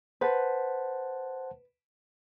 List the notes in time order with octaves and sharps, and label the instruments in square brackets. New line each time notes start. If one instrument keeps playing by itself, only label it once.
[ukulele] B4 [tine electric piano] C5 F#5 A5